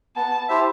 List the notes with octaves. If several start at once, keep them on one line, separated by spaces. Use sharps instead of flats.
B3 A5
E4 G4 C5 E5